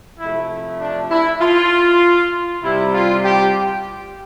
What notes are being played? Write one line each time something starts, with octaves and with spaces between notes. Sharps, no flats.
C3 F3 A3 E4
D4
E4
F4
C3 G3 E4
F4
G4